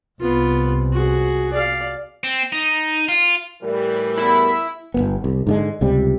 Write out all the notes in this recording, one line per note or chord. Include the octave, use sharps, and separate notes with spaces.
C2 B3 F4
F#4 G#4
D5 F5
C4
D#4
F4
A2 E3 G3 A#4
E2 B3 E4 B5 B6
G1 E2 B3
C2
G#2 D3 G#3
C#2 C3 G3